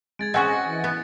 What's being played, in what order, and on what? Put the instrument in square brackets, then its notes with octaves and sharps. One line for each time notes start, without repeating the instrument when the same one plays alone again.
[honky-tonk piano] G#3 [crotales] G#6 A6 D7
[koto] C4 C#4 F#4 [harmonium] G#4 [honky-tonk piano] D#5 F#5 G#5
[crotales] A#6 C#7
[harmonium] E3 [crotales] G#6
[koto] B3